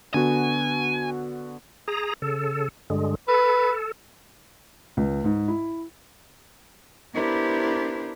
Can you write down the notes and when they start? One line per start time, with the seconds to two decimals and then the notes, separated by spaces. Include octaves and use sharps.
0.14 D3 B3 F#4 G#5
1.88 G#4 A#5
2.22 C#3 A4
2.90 G2 D3 G#3
3.28 A4 B4
4.97 C#2
5.24 G#2
5.48 E4
7.13 B3 D4 E4 G4 A#4 C5